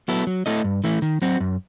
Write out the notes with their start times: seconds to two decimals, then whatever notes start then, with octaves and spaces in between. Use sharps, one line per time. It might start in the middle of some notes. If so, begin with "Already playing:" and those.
0.08 F#3 B3 E4 A4
0.27 F#3
0.46 A3 E4 A4 D#5
0.64 G2
0.84 E3 A3 E4
1.02 D#3
1.22 F#3 C4 F#4
1.40 F#2